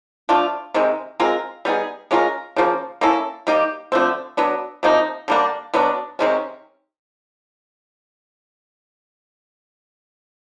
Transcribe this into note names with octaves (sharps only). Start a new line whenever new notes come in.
F3 A3 D4 F4
C3 D#3 G#3
G#3 C4 F4 A#4
G3 B3 D#4 G#4
G#3 C#4 F4 A#4
C#3 F3 A#3
A#3 C#4 E4 A4
G3 A#3 D#4 G4
D3 F3 A3 C4
F#3 B3 D4
C3 F3 A#3 D#4
D3 G3 A#3 D4
B2 F#3 B3 D4
C3 D#3 G#3 C#4